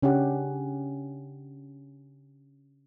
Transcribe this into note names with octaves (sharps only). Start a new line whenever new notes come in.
C#3 C#4 D4 G4 F#5